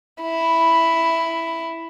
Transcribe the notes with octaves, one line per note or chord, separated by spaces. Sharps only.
E4